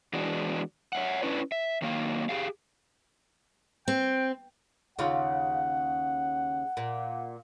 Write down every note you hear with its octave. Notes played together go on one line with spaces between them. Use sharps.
E3 G#3 B3 D4 F#4
C#5 E5 F#5
C#4 D4 E4 B4
E5
D#3 F#3 A#3 F5
G4 G#4 F5
C4 G5
D#2 C#3 F4 F#5
A#2